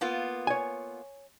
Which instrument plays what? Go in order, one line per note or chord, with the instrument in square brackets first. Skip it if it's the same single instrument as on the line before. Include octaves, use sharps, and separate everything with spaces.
[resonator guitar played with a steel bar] A#3 B3 F4
[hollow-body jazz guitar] C#5 G#5